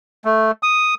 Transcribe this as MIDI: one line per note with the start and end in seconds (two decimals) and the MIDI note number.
0.25 0.51 57
0.63 0.94 87